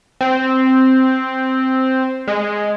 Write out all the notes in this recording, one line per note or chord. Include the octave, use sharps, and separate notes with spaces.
C4
G#3